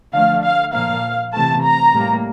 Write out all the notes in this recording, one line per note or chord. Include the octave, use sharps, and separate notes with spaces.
D3 F3 A3 F5
F5
A#2 F3 A#3 F5
C3 E3 A3 A5
A#5
A2 G3 A#3